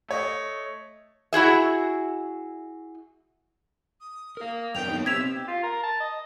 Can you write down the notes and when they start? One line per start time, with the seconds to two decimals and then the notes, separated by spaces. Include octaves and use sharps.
0.08 A3 C#5 D#5
1.33 E4 F#4 G#4 E5
4.01 D#6
4.37 A#4 F5
4.75 F#2 B3 D4 G5 F7
4.89 D#2 B3 D#4
5.06 C3 E6 G#6 B6 F7
5.36 G4
5.48 F4
5.64 A#4
5.83 A5
6.01 D#5